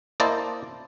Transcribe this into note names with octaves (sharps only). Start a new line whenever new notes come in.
A#3 E4 C5 D5 D#5 A5